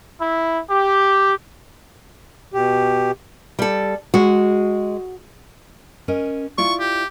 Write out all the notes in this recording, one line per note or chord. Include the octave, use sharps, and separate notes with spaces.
E4
G4
B2 G4
G3 A4
G#3 F#4
C#4 A#4 D#5
E4 F4 D5 C#6
G4